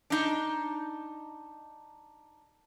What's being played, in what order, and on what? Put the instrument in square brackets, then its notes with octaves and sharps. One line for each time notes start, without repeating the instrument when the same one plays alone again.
[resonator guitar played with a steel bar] D4 D#4